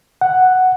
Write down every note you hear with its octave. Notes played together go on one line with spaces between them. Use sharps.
F#5